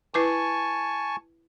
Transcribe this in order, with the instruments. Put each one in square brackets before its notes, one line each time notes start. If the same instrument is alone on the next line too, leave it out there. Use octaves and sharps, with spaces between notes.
[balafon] E4 B4 D6 [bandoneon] G#5 A5 C#6